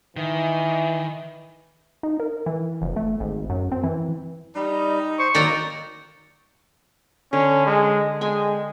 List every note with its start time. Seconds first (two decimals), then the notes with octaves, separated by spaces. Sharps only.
0.17 D#3 E3
2.03 D#4
2.20 A#4
2.46 E3
2.82 F1
2.96 A3
3.20 G#1
3.50 F#2
3.72 C4
3.84 E3
4.56 G3 D#4
5.19 C5 C#6
5.35 D3 D#3 F#3 A#3 D5 G5 A#5
7.33 D3 C#4
7.66 G#3
8.21 G#3 G5 G#5